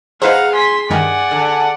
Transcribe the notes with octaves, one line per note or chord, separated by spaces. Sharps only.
D#4 G#4 B4 C5 F5 F#5 A#5
G#5 C6 B6
G2 D#3 D5 F#5 G#5
D3